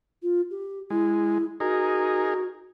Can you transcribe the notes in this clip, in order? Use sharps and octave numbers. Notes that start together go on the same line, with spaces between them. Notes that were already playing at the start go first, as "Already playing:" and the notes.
F4
G4
G#3 E4
D#4 F#4 G#4 A#4